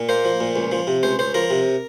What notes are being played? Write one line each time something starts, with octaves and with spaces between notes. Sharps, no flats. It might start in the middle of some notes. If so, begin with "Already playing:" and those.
Already playing: A#2
A#3 C5
F3
A#2
C#2
F3
C3
C#2 C5
C#2 C5
F3 A#4
C3